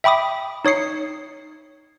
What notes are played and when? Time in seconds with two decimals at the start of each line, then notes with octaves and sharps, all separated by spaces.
0.04 E5 G5 B5 D6 D#6
0.65 D#4 C#5 D#6 C7 C#7